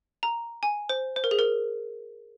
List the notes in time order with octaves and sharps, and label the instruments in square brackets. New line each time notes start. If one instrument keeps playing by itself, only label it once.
[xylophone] A#5
G#5
C5
C5
A#4
G#4
A#4